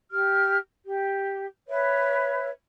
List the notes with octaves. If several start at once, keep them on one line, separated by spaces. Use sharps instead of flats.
G4 F6
G4
B4 C#5 E5